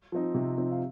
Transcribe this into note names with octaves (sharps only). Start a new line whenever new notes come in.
F3 C4 D#4
C3
F3 C4 D#4
F5